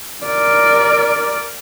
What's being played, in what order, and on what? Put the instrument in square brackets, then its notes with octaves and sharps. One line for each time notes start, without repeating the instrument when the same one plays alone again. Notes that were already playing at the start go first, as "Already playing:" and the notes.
[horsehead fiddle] A#4 D5